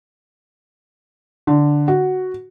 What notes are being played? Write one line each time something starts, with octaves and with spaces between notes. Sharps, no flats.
D3
F#4